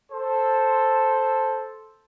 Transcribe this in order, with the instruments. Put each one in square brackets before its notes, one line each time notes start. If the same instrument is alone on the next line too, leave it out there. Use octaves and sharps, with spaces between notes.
[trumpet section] A4 C5